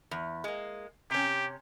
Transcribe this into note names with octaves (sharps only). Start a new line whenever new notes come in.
E2
G#3 A#3
C3 C#4 G4